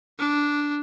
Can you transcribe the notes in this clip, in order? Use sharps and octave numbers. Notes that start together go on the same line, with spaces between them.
D4